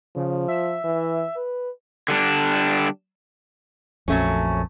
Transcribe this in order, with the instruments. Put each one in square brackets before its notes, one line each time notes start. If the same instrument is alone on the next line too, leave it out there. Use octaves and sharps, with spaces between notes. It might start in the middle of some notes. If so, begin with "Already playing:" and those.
[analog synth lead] C#3 [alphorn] F3
[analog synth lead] E5
[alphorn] E3
B4
[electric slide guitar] D3 G3 D4
[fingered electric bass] A#1 F2 [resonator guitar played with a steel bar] F#3 A3 C#4